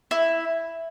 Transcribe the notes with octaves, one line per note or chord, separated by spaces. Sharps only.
E4